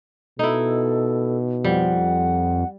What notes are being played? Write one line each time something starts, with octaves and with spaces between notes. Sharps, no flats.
B2 D#4 E4 A4
F2 G3 F#5